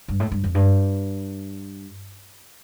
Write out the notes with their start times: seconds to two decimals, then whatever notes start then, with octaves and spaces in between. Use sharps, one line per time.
0.08 G2
0.20 A2
0.32 G2
0.44 F2
0.55 G2